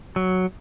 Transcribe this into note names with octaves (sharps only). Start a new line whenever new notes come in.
F#3